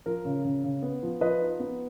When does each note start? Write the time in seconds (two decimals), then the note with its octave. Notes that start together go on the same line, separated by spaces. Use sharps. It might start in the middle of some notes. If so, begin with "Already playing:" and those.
0.06 F3 A#4
0.25 C#3
0.45 C#3
0.64 C#3
0.82 B3
1.03 F3
1.21 F3 B4 D#5
1.41 D#4
1.60 B3